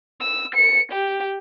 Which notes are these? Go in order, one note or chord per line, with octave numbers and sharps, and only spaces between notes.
E6
C#7
G4